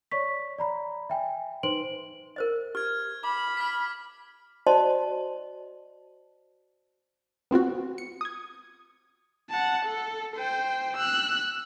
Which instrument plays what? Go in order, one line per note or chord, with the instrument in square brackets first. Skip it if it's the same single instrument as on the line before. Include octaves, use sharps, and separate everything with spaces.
[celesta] C#5 D5 C#6 B6
D5 A#5 B5
E5 G5 G#5
D#4 B4 C5 C6 D7 F#7
[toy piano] A#4 C5 D#5
[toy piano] G4 [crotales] F6 G#6
[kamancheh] B5 [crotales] D6
[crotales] F6 B6
[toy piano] F#4 C5 D5 D#5 A5 C6
[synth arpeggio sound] B3 C4 F4 F#4
C#7
D#6 G#6
[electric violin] F#5 A5
A4
C5 G5
E6 F#6